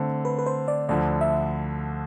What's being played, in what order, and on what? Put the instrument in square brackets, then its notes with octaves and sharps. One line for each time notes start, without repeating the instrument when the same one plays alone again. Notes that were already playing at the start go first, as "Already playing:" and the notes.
Already playing: [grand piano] D3 A3 C4
[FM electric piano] B4
B4
C5
D5
[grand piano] D2 D3 F3 [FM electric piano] D5
[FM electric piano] E5